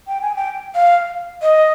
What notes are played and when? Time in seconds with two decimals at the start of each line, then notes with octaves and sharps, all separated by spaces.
0.08 G5
0.22 G#5
0.36 G5
0.75 F5
1.42 D#5